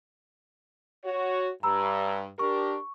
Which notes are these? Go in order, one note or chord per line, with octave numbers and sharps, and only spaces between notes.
F#4 C#5
G2 A#5 B5 E6
D4 G4 A#4 C#6